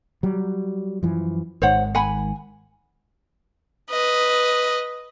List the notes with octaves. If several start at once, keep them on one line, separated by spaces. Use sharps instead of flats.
F#3 G3
F#2 E3 F3
G#1 G#2 D#3 C5 C#5 F#5
F#5 G#5 B5
B4 D#5